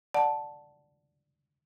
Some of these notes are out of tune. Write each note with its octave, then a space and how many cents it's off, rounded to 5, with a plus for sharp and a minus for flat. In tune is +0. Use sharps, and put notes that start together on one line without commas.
D5 +0 F#5 +0 A5 +0